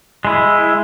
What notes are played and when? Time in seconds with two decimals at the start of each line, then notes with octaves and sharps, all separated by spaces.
0.25 G#3 E4